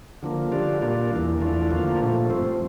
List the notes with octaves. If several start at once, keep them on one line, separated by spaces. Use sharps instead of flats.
D3 F3 A#3
D3 G3 D4 F4
A#2 G3 A#3 D4 F4
E2 E3 A#3
E2 E3 A3 D4 F4
D3 F3 A#3 F4
A#2 F3 A3
G2 F3 C4